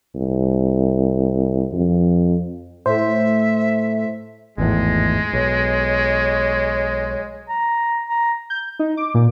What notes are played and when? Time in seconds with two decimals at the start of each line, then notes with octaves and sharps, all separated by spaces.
0.15 C2
1.72 F2
2.86 A2 C5 E5
4.58 G#1 E2 A2 G#3
5.33 B1 C#5
7.49 A#5
8.09 A#5
8.50 G6
8.79 D#4
8.97 D6
9.14 A#2